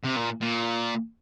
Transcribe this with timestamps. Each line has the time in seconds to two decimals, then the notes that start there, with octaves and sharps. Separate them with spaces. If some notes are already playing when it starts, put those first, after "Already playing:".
0.04 C3
0.17 A#2
0.41 A#2